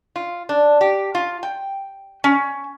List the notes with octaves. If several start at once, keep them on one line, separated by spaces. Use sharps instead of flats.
F4
D4
G4
F4
G5
C#4